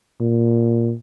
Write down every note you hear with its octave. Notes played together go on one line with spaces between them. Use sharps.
A#2